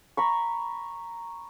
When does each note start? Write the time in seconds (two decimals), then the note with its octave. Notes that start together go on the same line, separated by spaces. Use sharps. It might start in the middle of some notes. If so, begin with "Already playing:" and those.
0.17 A#5 B5 C#6